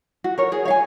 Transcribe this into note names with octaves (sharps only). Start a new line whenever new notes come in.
F#4
A#4 C#5
G#4
C#5 F5 G#5